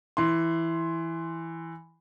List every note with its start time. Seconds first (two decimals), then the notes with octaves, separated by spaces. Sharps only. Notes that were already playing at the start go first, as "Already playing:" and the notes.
0.17 E3 C6